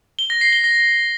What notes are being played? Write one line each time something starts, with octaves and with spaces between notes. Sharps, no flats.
G7
A#6
C7
G7
A#6